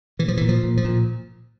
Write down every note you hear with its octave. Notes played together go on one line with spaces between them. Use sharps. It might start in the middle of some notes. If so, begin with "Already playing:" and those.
A#2 E3
F3
E3
A#2
F3
A#2
F3
A#2